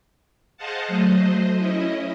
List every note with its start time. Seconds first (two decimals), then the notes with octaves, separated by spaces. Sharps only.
0.57 G#4 C5 D#5 F5 F#5 A5
0.88 F#3 A3 C5 D#5
1.56 C#4 E4 D#5